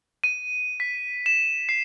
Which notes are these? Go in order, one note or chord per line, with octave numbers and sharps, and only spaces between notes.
D#7
B6
E7
C7